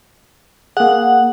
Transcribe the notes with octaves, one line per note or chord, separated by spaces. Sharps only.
A#3 G#4 F#5